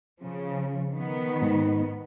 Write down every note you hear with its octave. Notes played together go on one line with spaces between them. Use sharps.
C#3 F3
D#3 B3
G#2